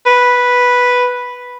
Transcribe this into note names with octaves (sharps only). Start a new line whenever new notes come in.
B4